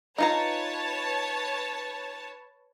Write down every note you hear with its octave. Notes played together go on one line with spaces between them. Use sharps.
D#4 F4 B4 C#5 A5 A#5